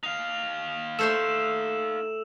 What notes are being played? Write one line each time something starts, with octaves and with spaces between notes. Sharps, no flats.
D#4 F5 F7
A3 C5 E5 E6 E7